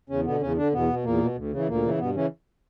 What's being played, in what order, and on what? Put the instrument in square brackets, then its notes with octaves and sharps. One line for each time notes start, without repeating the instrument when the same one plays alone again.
[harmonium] E2 C#3 C#4
B2 D3 B3
E2 C#3 C#4
D3 D4
E2 B2 B3
B2
E2 A#2 A#3
B2
D2
C#3 E3
D2 A#2 A#3
C#3 E3
G2 B2 B3
C#3 E3 C#4